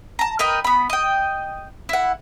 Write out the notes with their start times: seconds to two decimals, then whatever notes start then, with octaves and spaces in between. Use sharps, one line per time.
0.19 A5 A#5
0.39 A#4 B4 D#5 G5
0.64 B3 B5
0.90 D#5 G5
1.89 E4 F#5